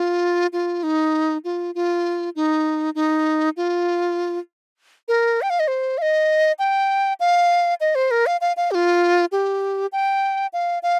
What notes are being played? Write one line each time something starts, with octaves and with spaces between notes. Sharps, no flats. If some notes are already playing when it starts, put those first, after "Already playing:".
Already playing: F4
F4
D#4
F4
F4
D#4
D#4
F4
A#4
G5
F5
D#5
C5
F5
D#5
G5
F5
D#5
C5
A#4
F5
F5
F5
G4
F4
G4
G5
F5
F5